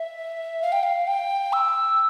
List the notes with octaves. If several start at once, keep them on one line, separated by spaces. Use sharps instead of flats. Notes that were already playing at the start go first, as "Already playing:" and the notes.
Already playing: E5
F5
G5
F5
G5
E6